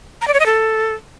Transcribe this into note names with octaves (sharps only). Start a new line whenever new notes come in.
A#5
D5
C#5
D#5
A4